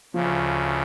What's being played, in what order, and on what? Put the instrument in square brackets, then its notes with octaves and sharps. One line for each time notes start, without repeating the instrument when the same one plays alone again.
[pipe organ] D2 C#3 [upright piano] F3